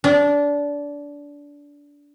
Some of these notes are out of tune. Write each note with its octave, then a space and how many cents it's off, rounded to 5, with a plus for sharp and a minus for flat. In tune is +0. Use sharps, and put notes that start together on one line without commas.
D4 -20